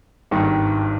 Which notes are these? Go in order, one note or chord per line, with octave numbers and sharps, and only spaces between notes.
G#1 G2 D#3